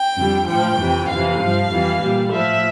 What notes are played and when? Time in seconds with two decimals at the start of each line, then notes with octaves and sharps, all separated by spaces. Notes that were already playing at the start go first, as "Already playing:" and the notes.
Already playing: G5
0.16 F2 D3 G3
0.47 A2 F3 G5
0.78 F2 C3 E3
1.09 F2 C3 E3 F5
1.41 G2 F3
1.71 F2 E3 G3
2.01 A#2 G3
2.32 A2 F3 E5